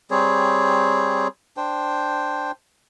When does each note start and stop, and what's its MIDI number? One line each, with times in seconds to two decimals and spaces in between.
0.11 1.28 55
0.11 1.28 60
0.11 1.28 68
0.11 1.28 73
1.57 2.52 62
1.57 2.52 72
1.57 2.52 79